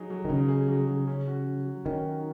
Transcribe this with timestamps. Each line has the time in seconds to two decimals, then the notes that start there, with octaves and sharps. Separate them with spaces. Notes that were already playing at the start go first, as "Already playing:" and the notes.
Already playing: F#3 D#4 G#4
0.10 F#3
0.25 D#3
0.29 C#3 D#4
0.48 G#4
0.69 F#3
0.87 F#3
1.07 C#4
1.28 F#4
1.46 F#3
1.66 F#3
1.85 D#3 C#4
2.05 F#4